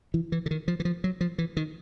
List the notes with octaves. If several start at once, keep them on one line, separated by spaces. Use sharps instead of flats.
E3
E3
D3
D#3
F3
E3
F3
F#3
F3
E3
D#3